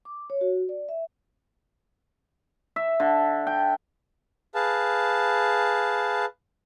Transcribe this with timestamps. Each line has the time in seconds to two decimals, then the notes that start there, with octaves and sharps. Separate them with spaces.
0.05 D6
0.30 C#5
0.41 F#4
0.69 D5
0.89 E5
2.76 E5
3.00 D3
3.47 G5
4.55 G#4 B4 F5 A5